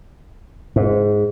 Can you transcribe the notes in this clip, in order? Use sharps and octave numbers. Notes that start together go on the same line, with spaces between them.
G#2